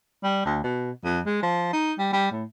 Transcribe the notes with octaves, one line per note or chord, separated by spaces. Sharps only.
G3
D2
B2
F2
G#3
F3
D#4
G3
G3
A2